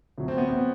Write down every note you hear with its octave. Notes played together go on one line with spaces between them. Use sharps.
D2 C3 F#3
C4
B3
B3